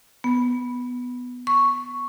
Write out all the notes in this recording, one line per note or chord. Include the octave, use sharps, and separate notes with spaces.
B3
C#6